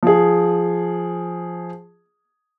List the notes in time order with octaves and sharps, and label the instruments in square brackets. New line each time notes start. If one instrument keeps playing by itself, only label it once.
[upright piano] F3 G#4